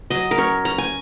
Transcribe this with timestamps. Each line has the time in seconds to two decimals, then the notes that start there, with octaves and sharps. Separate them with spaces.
0.10 F#3 D#5
0.31 A#4
0.38 C#4 C#5
0.65 C#4 A#5
0.78 G#5